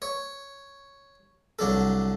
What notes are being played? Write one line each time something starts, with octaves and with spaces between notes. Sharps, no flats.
C#5
C2 F#3 D4 A4